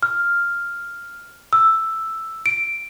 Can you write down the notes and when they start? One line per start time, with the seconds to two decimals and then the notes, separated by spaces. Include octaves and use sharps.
0.03 F6
1.53 E6
2.46 D7